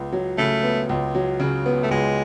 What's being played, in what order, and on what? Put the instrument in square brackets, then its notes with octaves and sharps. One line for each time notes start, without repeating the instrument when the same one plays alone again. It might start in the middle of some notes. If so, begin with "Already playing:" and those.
Already playing: [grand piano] C#2 B3
F#3
[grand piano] C#3 [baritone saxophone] A3
[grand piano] B3
C#2
F#3
C#3
B3
[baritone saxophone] A3
[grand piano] C#2 [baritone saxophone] G#3